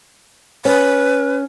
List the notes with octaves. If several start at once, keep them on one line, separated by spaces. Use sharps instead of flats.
C#4 B4